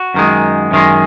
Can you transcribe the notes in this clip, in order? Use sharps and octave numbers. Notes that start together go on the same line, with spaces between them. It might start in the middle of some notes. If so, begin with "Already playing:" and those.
Already playing: F#4
F#2 D#3 G#3
F#2 D#3 G#3